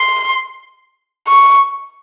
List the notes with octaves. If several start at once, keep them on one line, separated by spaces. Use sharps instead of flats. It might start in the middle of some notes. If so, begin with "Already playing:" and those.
Already playing: C6
C#6